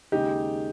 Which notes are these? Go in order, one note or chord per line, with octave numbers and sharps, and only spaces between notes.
D#2 C#3 G#3 D#4 G4